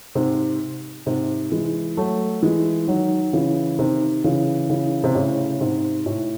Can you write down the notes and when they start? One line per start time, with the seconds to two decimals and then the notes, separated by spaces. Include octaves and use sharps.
0.15 G#2 C3
1.06 G#2 C3
1.52 E3 G#3
1.97 F#3 A3
2.43 E3 G#3
2.88 D#3 F#3
3.33 C#3 E3
3.79 C3 D#3
4.24 C#3 E3
4.70 C#3 E3
5.04 C3
5.15 A2 C#3
5.60 G#2 C3
6.06 A2